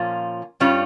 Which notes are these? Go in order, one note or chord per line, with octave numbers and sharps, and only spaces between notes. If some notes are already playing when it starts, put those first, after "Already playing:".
Already playing: A#2 F3 A#3 C#4 F4
G2 G3 C#4 F4